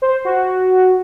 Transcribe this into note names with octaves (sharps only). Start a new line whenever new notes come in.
C5
F#4